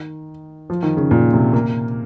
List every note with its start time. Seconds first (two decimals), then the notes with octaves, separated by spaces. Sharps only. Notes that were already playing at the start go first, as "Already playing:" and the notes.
Already playing: D#3
0.70 F3
0.83 D#3
0.97 C#3
1.11 A#2
1.33 C3
1.53 A#3